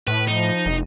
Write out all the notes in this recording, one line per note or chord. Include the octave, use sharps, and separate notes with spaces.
A2 B4
F3 D#4
F1